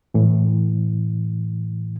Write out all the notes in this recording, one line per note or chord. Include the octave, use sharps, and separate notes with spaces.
A2 E3